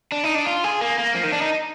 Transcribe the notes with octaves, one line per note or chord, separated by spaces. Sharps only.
D4
D#4
D4
F4
G#4
A#3
A#3
F3
D#3
D4
D#4